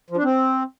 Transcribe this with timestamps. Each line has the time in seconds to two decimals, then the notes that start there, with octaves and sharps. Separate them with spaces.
0.10 F3
0.17 D4
0.23 C4